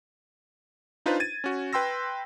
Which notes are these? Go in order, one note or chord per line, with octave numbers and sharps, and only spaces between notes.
D4 D#4 F4 B4 C5
G#6 A6 D#7
C#4 F#4
B4 G5 C6 E6 A#6